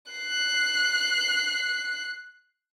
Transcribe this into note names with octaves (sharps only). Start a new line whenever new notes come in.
F#6 C7